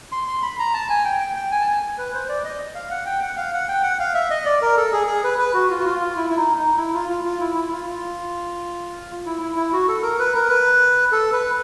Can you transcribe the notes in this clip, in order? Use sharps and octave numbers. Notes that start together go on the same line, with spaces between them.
C6
C6
B5
A#5
A5
G#5
G5
G5
G5
G#5
A5
G#5
B4
C5
D5
D#5
F5
F#5
G5
F#5
F5
F#5
G5
F#5
F5
E5
D#5
D5
A#4
A4
G#4
G#4
B4
B4
F#4
F4
F#4
F4
F4
E4
E4
D#4
D#4
E4
F4
F4
F4
E4
E4
F4
F4
E4
E4
E4
F#4
A4
A#4
B4
A#4
B4
A4
B4